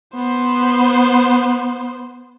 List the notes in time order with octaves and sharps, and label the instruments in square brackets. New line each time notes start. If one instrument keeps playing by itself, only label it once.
[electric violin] B3 C5